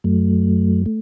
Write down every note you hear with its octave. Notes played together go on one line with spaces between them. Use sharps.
F#2 F#3 A3
A3